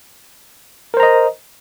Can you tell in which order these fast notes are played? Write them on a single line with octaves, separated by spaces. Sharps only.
A#4 C5 A#5 D#5